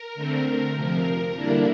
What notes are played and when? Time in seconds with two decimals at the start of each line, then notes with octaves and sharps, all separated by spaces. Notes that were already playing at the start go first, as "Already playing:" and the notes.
Already playing: A#4
0.15 D3 A3 C4
0.75 F2 C3 F3
1.35 D3 G3 A#3 D4 E4